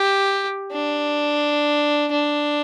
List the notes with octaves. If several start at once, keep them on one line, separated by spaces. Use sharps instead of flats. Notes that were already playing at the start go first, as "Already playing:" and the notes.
Already playing: G4
D4
D4